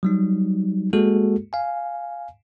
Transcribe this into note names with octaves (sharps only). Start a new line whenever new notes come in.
F#3 G3 D#4
G#3 A#3 F#4 G#4 A4
F5 G#5